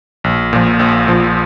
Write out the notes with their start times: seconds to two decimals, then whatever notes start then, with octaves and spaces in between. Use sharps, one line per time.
0.24 A#1
0.53 A#2 F3
0.79 A#1
1.07 A#2 F3